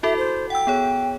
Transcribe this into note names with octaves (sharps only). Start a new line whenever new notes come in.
E4 F#4 A4 E5
C5
F#5 G5 E6
B3 G#4 C#5